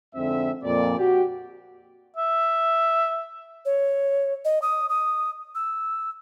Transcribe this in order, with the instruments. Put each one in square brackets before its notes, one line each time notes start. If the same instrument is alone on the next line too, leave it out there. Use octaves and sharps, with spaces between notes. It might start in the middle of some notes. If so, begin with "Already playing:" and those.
[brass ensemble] F2 G#2 D3 C4 E5
F2 A#2 D5
F#4 G4
[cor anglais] E5
[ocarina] C#5
D#5
D#6
D#6
E6